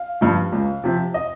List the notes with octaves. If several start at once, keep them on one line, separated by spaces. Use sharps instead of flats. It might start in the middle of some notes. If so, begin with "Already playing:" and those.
Already playing: F5
G2 F3
C#2
C3 F3
D#5